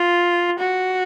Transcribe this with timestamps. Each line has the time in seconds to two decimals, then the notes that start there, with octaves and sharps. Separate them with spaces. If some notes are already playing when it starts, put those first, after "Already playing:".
Already playing: F4
0.59 F#4